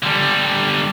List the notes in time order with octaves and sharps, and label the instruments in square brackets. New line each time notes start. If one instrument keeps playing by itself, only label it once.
[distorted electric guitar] D3 G3